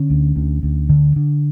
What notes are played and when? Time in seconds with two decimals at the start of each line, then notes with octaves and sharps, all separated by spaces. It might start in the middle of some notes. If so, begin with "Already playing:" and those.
Already playing: D3 C#4
0.10 D2
0.36 D2
0.63 D2
0.89 D3
1.16 D3